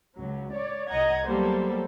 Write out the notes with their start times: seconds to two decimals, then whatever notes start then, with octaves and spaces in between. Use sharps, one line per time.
0.16 C#2 F#3
0.55 C#5 D5
0.89 C2 D#5 F#5 A#5 G#6
1.26 F#3 G3 A#3 B3 A4 C5